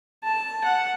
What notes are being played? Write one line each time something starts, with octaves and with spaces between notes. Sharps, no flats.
A5
F#5